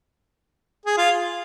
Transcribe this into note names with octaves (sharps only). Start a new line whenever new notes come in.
G#4
F4